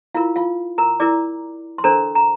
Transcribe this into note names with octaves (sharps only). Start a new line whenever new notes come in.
E4 F4 A#4 F5
F4 F5
A#4 A#5
E4 A#4 D5 D6
C6
D4 A4 A#4 C5 A#5
A#5